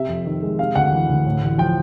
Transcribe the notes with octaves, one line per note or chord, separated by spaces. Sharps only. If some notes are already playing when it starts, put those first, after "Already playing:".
Already playing: C3 E5
F2
D#3
G#3
C3 F5
D2 F#5
E3
D2
A2
A1
F3 G5